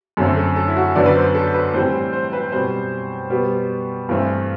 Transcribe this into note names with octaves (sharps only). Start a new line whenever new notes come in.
F#2 D3 A3 C4 A4
A4
A4
E4
F#4
F#2 D3 F#3 B3 D5
B4
C5
A4
B4
A2 E3 G3 C4 C5
C5
B4
B2 G3 C4 C5
B2 G3 B3
G2 E3 A3 C4